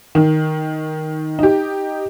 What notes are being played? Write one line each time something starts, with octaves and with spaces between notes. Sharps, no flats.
D#3
D#4 G4